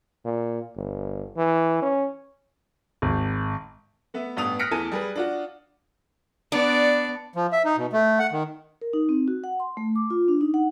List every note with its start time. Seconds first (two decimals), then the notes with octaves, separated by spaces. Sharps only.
0.25 A#2
0.76 G1
1.37 E3
1.82 C#4
3.02 G#1
4.14 A3 B3 E5
4.36 A1 G2 B3 D#6 F7
4.59 F6 F#6 A#6 B6 C#7 D7
4.71 E2 E3 A3 G#5 A5 D#7
4.92 G3 G#4 B4
5.16 D4 F4 F#4
6.52 B3 D4 D5
7.35 F3
7.52 E5
7.65 D#4
7.77 B2
7.93 A3
8.19 F#5
8.32 D#3
8.82 A#4
8.93 D#4
9.09 C4
9.28 F#4
9.44 F#5
9.60 C6
9.77 A3
9.96 D6
10.10 F4
10.28 D4
10.41 D#4
10.54 F#5